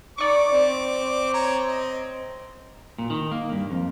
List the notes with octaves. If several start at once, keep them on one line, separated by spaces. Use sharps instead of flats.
D#4 D5 C#6 D6
C4
C#5 A#5
D#5
A#2
D#3
A#3
G2
F2